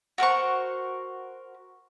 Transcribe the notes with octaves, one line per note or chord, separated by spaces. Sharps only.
F#4 A#4 C5 C#6